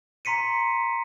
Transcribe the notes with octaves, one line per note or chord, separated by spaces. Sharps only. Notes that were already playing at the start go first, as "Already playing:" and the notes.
A#5 C6 B6 C#7 D#7